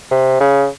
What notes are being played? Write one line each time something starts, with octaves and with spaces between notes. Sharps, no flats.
C3
C#3